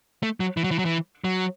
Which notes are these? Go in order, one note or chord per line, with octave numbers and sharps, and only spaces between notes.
A3
F#3
E3
F#3
E3
F#3
E3
F#3